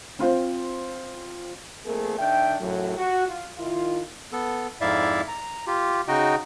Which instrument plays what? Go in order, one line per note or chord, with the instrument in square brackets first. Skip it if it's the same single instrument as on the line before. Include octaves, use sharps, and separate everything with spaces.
[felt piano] C4 F4 C5
[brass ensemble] F2 A3 A#3 C4 G#4 A#4
D#3 D4 E5 G5
C#2 F#2 A2 F#3
F#4
F4
D#3 E4 F4
[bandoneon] B3 A4
F2 G#2 E4 D5 E5 F5
A#5
F4 G4
C#3 D#4 F#4 D#5 G5